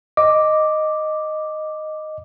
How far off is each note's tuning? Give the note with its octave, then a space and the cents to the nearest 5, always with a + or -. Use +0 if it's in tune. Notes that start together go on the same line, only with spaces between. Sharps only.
D#5 -5 D6 +0